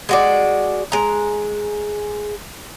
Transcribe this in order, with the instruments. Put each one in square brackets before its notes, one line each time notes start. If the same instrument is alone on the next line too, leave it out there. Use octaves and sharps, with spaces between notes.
[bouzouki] G#3 F#4 D5
G#3 A#5